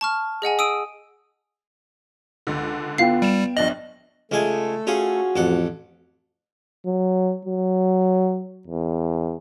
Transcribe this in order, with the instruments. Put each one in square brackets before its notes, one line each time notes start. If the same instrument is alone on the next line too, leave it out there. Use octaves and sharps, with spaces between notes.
[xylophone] A5 C#6 F6
G#4 D#5 F#5 G#5
D#6 E6 D7 D#7
[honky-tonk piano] C#2 D3
[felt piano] B3 F4 G5 [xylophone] F5 C7
[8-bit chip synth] G3 [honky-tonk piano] D7 E7
[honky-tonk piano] A#1 D4 F#7 [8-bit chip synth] D#5
[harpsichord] C#2 G#3 G#5 [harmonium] A3 A4
[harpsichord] C#4 F4 G#4 [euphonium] F#4
[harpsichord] A1 A4 F#5 [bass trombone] F2
[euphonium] F#3
F#3
E2